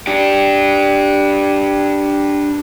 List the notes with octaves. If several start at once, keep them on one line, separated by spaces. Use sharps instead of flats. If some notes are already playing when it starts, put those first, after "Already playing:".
D4 G4